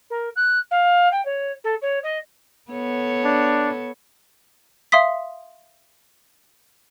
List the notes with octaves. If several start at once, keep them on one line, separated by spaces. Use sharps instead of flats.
A#4
F#6
F5
G5
C#5
A4
C#5
D#5
B3 A4 C#5
D4
E5 F5 C6 D#6 B6